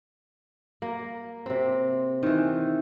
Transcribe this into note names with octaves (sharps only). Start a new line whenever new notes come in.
A#3
C3 C4
D#3 E3